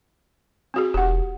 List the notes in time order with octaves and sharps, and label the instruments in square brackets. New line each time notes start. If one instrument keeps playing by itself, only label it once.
[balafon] C4 F#4 G#4
[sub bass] E1 [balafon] G4 F#5